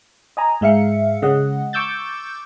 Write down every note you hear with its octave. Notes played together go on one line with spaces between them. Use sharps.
D#5 G#5 A#5
G#2 G#3 E5 F5 C#7
C#3 G#3 D#5 F#5
C#6 D6 E6 G6 A6